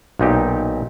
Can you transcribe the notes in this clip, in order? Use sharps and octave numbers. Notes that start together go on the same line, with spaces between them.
B1 A#2 D#4 G4